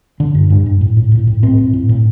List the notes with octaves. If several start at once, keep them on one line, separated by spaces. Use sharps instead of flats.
D3 D4
G2
G2
G2
A2
A2
A2
A2
A2 C4
A2
A2
A2